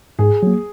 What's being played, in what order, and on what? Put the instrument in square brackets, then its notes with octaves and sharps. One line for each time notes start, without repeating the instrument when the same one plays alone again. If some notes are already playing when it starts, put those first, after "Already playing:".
[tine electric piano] G#2 [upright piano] G#4
[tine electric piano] F#3 A#3